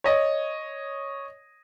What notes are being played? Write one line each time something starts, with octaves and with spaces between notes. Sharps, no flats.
C#5 D#5